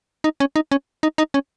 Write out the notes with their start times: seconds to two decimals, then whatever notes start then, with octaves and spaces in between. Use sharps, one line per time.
0.24 D#4
0.40 C#4
0.56 D#4
0.71 C#4
1.03 D#4
1.18 D#4
1.34 C#4